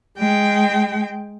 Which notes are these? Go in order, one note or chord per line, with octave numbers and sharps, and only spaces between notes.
G#3 G5